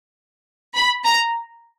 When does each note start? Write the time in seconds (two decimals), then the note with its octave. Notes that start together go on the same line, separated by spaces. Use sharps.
0.75 B5
1.05 A#5